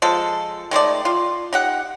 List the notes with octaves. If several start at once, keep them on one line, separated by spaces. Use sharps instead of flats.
F3 G#3 A4
D#3 G#3 A3 D5
F4
D#4 G4 F#5